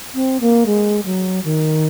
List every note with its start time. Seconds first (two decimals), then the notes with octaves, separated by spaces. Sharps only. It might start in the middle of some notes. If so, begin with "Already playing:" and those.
0.14 C4
0.41 A#3
0.66 G#3
1.05 F#3
1.44 D#3